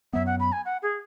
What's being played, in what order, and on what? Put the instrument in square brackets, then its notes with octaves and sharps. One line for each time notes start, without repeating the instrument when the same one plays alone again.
[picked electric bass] F#2 F#3 B3 [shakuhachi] E5
[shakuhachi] F#5
B5
G#5
F#5
G#4